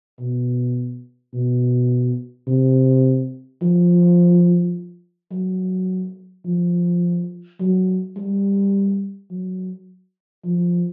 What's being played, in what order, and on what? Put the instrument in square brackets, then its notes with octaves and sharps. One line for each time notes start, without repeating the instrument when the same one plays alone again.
[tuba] B2
B2
C3
F3
F#3
F3
F#3
G3
F#3
F3